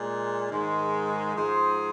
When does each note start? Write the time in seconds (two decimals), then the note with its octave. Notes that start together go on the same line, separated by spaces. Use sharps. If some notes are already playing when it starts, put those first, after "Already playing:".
Already playing: A#2 G#3
0.51 G#2 D#3 G#3
1.35 G#2 F3 G#3 G#4 C5